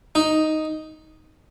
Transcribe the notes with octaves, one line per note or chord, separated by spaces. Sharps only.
D#4